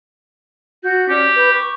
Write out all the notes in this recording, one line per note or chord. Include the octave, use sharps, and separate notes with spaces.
F#4 G6
C#4 G4 D5 F6
B4 G6
C#6 D6